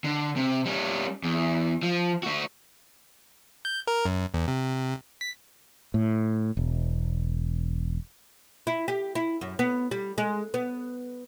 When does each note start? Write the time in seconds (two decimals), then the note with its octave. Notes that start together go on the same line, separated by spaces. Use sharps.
0.04 D3
0.36 C3
0.65 G3 C#4
1.23 E2
1.83 F3
2.23 A3 F#4
3.65 G6
3.87 A#4
4.05 F#2
4.34 E2
4.48 C3
5.21 B6
5.94 A2
6.57 E1
8.67 E4
8.88 G4
9.15 E4
9.41 F#2
9.59 B3
9.91 G3
10.18 G#3
10.54 B3